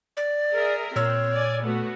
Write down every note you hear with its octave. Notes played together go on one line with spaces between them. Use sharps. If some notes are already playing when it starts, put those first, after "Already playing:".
D5
G#4 A#4 E5
A#2 C4 C#5 E6 F6
D5 G#5
A3 B3 F#4